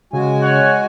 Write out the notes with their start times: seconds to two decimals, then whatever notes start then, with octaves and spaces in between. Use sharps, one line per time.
0.13 C#3 G#3 F#4 G#5
0.42 C#5 F#5